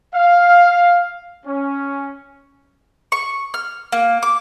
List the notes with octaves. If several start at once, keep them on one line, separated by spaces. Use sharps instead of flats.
F5
C#4
C#6
F6
A#3
D6